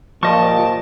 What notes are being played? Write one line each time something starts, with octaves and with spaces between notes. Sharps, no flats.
A#2 F3 G4 D#5 A5 C#6